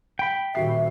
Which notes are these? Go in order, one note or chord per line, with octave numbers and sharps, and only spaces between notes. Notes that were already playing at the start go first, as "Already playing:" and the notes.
G5 B5
D#1 F#4 E5 C7